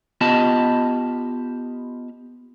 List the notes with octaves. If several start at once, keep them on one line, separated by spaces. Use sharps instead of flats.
B3 F4 G4 D#5 A5